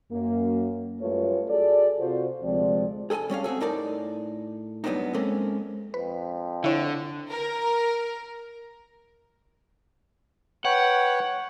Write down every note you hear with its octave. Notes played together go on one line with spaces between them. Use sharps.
F#2 A#3
F#2 G3 A3 F4 B4 C#5
F#4 G#4 A4 D5
C3 F4 F#4 C5
D2 C3 F3 G#3 C4 D5
G#4 A4 D5 G#5 A5
G3 C#4 C#5 F5
C4 F#4 G#4 A4
A2 D#4 A#4 D5 A5
G2 F#3 B3 C4 D4 D#4
G#3 A#3 C4 C#4 A4 A#4
F2 B4
D3 E4 C#5
A#4
B4 C#5 F#5 G5